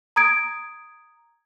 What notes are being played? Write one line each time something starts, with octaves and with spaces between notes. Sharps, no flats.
A#5 D#6 G#6 D7